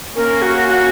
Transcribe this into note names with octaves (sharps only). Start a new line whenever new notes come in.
A#3 C#4 A#4
F#4
F#4